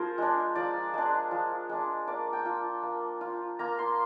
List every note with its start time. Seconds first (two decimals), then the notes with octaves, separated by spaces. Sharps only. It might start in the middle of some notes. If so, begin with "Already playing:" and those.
Already playing: F3 F4 G#4 A#4 C5
0.18 G#3 D4
0.55 F3 D5
0.94 G#3 D4
1.31 F3
1.69 G#3 D4
2.07 A#3 D5
2.33 G5
2.45 F4
2.83 A#3
3.21 F4
3.59 A#3 A#5
3.79 C6